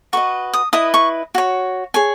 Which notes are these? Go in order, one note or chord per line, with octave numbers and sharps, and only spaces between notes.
F#4 B4 D#5 C#6
D#6
E4 B4 D#5 D#6
C#6
F#4 C#5
G#4 C#5 G#5